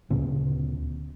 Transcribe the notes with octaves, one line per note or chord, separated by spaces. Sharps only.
D2 A#2 C#3 B3